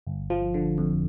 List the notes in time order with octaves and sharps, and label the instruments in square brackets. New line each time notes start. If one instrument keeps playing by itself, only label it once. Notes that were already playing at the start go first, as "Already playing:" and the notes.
[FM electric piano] G1
F3
D3
F2